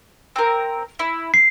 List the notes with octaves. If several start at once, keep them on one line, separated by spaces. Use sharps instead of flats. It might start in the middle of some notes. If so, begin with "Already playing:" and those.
C4 A#4
E4
C7